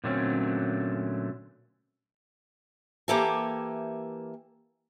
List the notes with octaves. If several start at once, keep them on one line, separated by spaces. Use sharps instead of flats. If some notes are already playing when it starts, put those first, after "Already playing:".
A#2 D3 F#3 A3 C4 C#4
E3 A#3 G4 A4 E5 G#5